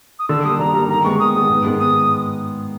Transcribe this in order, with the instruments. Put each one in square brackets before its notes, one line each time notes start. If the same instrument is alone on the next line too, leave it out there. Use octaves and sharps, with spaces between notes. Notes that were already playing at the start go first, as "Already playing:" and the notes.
[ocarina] D#6
[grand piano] D3 [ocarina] E6
[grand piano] G3 A#3 [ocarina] D#6
[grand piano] D3 [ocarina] A#5
[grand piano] G3 A#3 [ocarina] A#5
[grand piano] D#3 [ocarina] A#5
[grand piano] G#3 B3 [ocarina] C#6
[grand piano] D#3 [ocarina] D#6
[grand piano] G#3 B3 [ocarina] D#6
[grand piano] G#2
D#3 G#3 B3
[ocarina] D#6